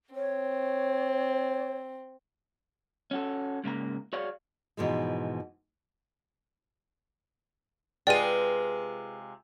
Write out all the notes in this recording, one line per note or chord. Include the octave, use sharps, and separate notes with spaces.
C4 C#5
C#4 F#4 A4
G#2 C#3 A#3 A#5
F#4 G#4 C#5 D5 F5
G#2 B2 E3 F3 G#3
C3 G#3 F4 G#4 B4 D5 G5 D#7